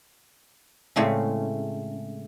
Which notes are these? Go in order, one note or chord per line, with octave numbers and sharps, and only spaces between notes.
A2 C#3 G#3 A3 C4 C#4